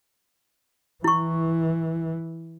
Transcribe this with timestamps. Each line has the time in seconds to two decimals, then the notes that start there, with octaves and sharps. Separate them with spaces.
1.04 E3 E4 C#6